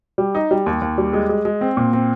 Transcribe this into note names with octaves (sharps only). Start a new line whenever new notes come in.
G3
D#4
G3
D#2
D#2
G3
G#3
G#3
G#3
C4
A#2
C4